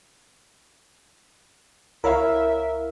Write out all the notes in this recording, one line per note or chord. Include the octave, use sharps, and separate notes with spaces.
C#2 E4 A#4 C#5 E5 F5